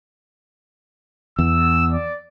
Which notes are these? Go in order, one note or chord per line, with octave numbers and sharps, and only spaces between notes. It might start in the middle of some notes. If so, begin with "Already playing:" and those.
E2 E6
D5